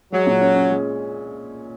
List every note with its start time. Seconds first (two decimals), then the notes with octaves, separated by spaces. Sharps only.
0.12 F#3 G#3
0.27 A#2
0.41 C#4
0.55 C#4
0.70 G#3